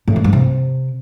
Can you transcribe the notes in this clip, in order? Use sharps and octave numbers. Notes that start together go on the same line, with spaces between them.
A2
D#3
G2
C3